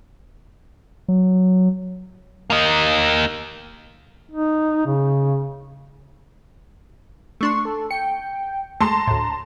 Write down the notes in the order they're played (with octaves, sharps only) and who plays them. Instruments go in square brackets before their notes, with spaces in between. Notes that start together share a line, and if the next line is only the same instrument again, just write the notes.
[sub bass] F#3
[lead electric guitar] A#3 D#4
[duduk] D#4
C#3
[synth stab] A3 D4 C6 [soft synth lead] C#6
[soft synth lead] A4
[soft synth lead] G5 [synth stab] C#7
[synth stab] G#3 A3 [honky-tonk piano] A5 C6 [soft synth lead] A#5
[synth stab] D2 A2